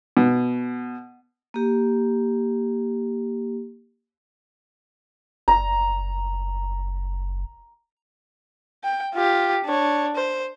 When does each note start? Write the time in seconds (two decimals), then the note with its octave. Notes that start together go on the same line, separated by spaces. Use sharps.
0.17 B2
1.54 A#3 G4
5.48 F#1 A#5
8.83 G5
9.14 F4 G4
9.65 D4 C#5
10.16 C5